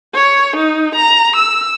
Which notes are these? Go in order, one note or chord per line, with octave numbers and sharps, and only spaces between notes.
C#5
D#4
A#5
E6